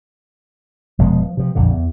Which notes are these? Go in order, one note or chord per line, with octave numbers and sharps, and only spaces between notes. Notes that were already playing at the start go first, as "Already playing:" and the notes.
F1 B2 F3 G#3
F3
C3 F3
A#1 F2 D3
E2